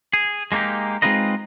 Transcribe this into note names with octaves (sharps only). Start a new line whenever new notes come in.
G#4
G#3 A#3 D4 D#4 G4
G#3 C4 D#4 F4 B4 D#5